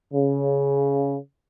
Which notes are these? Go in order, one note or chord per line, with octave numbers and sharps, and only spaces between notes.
C#3